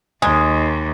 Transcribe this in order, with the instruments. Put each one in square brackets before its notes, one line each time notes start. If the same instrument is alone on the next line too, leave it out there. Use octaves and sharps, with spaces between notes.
[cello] D#2 [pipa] G#3